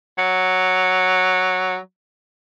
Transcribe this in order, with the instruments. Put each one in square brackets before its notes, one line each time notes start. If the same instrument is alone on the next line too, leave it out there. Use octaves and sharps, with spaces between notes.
[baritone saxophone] F#3